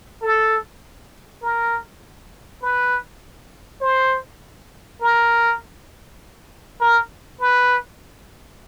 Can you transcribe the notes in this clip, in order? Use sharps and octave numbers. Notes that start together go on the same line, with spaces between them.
A4
A#4
B4
C5
A#4
A#4
B4